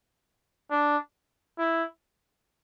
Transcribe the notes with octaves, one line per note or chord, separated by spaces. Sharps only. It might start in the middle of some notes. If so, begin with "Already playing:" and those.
D4
E4